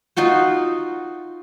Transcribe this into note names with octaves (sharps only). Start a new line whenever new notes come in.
D#4 F4 F#4 C5